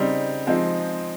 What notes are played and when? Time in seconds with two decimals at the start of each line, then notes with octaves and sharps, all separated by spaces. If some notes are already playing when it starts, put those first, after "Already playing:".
Already playing: C#3 G3 C4 D#4
0.47 F3 G#3 C4 D#4